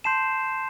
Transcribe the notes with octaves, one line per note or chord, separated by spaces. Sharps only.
A5 C6 G6 C7 E7